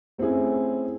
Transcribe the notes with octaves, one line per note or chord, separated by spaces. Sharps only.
A3 C4 C#4 E4 G#4